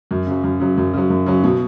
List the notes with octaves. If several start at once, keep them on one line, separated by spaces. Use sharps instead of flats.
F#2
C#3 F#3
F#2
C#3 F#3
F#2
C#3 F#3
F#2
C#3 F#3
B2